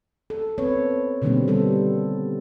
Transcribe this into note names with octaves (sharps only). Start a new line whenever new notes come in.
A4
B3 C4 B4 C#5
B2 D3 D#3 G3 A#3 C4
G3 B3 A4